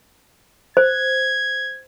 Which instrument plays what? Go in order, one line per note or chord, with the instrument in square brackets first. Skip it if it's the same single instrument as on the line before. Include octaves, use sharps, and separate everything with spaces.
[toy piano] C5 [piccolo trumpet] G#6